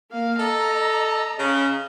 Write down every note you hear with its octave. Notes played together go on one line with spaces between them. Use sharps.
A#3 F5
A4 D#5 A#5
C#3